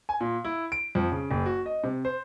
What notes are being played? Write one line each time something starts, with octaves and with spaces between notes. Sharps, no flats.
G#5
A#2
E4
D7
F2
C#3
F#1
F#4
D#5
C3
C5